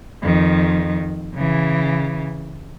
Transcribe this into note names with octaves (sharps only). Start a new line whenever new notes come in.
F2 D#3
C#3 E3